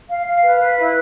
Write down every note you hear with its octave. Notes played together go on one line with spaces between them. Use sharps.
F5
F5
B4
B4
E4